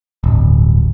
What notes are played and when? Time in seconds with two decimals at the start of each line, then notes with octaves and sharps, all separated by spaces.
0.24 D1 G1